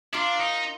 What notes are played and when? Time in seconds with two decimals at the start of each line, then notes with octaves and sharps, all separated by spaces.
0.13 D4 F4 A#4 F5
0.40 D#4